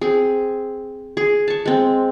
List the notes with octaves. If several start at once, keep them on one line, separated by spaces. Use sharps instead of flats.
C4 G#4
G#4
A5 C#6
G#3 C4